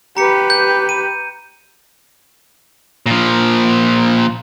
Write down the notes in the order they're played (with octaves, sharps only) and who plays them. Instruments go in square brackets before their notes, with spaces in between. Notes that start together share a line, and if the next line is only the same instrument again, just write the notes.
[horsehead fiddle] G4 B4 [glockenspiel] A#5 C#7
[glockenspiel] G6
D#7
[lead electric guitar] A#2 F3